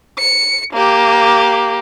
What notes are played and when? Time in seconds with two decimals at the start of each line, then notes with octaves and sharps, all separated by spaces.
0.19 C#7
0.73 A#3 G4